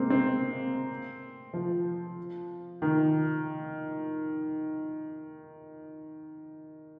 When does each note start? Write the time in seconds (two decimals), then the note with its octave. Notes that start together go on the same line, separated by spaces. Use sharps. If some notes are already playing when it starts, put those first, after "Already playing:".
Already playing: G#3 A#3 C4
0.10 C4
1.54 F3
2.82 D#3